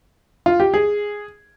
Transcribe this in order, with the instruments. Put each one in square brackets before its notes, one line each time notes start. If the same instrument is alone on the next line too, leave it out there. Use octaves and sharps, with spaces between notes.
[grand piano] F4
G4
G#4